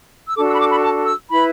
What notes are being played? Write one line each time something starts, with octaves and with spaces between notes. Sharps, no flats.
E6
D4 F#4 A4 D6
E6
B5
D6
B5
A5
E6
E4 B4 B5